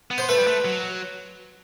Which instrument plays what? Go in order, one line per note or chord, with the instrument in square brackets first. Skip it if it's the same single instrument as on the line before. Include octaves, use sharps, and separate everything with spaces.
[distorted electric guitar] B3
[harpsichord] C5
[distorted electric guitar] A3 [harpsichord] B4
[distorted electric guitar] G3
A3
F#3